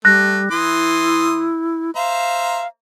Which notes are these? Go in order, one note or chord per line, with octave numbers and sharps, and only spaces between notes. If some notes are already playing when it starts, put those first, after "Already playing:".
G3 A3 F#6 A#6
E3 E4 C6 D#6
C5 E5 F5 A#5